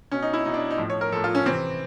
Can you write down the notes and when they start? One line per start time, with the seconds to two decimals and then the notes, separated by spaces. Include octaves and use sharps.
0.11 B2 C#4
0.22 D#4
0.33 E4
0.45 B2 D#4
0.54 D4
0.71 D#4
0.78 A2 F3
0.90 C#5
1.01 A#4
1.12 A2 F3 A4
1.24 F4
1.35 C#4
1.46 C3 E3 C4